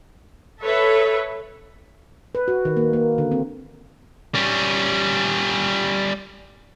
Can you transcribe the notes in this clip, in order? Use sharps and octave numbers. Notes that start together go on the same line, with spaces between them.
A4 B4 C#5 E5
B4
F#4
D#3
A#3
A#3
D3
C4
G3 C#4